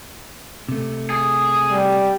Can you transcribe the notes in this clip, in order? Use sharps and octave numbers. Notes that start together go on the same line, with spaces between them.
C3 A3
G#4
G3